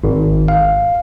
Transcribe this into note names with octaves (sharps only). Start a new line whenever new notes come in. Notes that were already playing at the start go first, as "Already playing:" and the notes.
G#1
F5